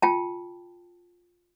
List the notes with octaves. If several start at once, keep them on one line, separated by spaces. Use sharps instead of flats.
F4 G5 A5